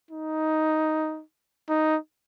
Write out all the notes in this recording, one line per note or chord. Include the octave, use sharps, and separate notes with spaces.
D#4
D#4